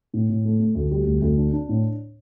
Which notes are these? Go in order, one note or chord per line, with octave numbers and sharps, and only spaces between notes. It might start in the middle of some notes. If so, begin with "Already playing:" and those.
A2
A2
A3
A3
D2
G3
D2
D2
D4
D4
A2